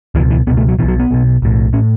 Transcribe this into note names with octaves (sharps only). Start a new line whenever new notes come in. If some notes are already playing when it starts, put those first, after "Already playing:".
C#2 B2 E3
E3
C#2 B2 B3
A3
F#3
B1 B2 E3
F#3
B3
B1 B2
B1 A2
A2 C#4